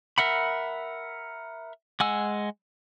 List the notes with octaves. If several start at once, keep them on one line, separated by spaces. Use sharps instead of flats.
A#4 E5 F#5 B5
G#3 F#5 G#5 E6